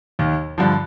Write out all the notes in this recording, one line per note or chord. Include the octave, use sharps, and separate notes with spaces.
D#2 D#3
G2 D3 F3